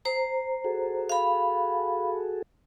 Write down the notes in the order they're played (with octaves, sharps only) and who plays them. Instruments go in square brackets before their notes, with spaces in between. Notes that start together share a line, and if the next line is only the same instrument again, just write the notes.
[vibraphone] C5 A#5
[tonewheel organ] F#4 G#4 A4
[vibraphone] F5 B5